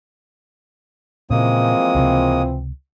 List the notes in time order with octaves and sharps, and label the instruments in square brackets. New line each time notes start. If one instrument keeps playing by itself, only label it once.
[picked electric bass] A#2 C#3 [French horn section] E3 F3 C4 [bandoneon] G#3 A#3 D#6
[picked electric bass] C#2 C3